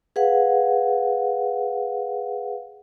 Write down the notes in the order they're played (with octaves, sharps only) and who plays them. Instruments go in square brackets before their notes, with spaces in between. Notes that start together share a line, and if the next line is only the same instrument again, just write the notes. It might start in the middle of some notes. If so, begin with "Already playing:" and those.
[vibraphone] G#4 B4 F5 F#5